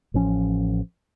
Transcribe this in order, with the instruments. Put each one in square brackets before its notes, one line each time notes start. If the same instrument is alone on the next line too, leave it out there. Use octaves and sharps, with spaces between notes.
[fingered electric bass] A1 F3 C#4